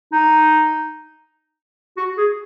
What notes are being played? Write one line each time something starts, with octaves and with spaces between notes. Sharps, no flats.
D#4
F#4
G#4